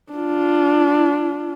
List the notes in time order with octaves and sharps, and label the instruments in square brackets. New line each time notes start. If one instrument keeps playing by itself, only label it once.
[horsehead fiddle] D4 F4